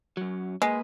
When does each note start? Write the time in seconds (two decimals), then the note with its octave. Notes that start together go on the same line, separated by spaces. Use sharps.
0.17 F#2 F#3
0.62 G#3 A#3 B4 D#5